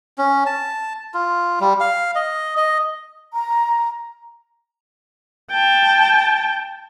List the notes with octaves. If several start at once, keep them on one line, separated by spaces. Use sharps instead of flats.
C#4
A5
F4
G3
F5
D#5
D#5
A#5
G5 A5